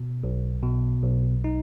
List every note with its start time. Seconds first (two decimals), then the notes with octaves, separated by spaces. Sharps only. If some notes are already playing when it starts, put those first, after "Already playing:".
Already playing: B2
0.24 B1
0.63 B2
1.04 B1
1.44 D#4